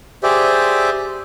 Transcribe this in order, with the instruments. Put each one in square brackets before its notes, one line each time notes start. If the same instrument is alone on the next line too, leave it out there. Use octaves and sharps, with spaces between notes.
[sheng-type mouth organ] G4 G#4 C5 D5 E5